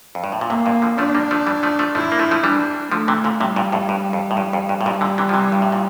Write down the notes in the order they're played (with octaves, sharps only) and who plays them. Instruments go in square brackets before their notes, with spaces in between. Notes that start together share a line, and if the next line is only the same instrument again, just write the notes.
[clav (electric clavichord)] F2
G2
A2
A#2
[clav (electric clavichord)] A2 C3 [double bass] A#3
[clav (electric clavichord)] G2 A#2
D3 F3
[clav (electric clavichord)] F3 A3 [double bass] D4
[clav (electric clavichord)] G3 A#3
F3 A3
E3 G3
F3 A3
F3 A3
[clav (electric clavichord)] F3 A3 [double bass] E4
[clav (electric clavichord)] A#3
F3 A3
F3 A3
[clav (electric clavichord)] E3 G3 [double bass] D4
[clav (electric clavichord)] D3 F3 [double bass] A3
[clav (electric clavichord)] C3 E3
A#2 D3
[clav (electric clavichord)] A2 C3 [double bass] G3
[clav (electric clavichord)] G2 A#2
F2 A2
G2
F2
A2
[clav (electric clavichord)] G2 [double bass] G3
[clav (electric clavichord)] F2
G2
A2
[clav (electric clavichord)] G2 A#2 [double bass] G3
[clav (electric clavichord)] A#2 D3
C3 E3
F3
C3 E3
G2
A2
A#2